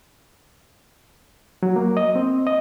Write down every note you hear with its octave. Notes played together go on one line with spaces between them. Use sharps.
F#3
A#3
D#5
C4
D#5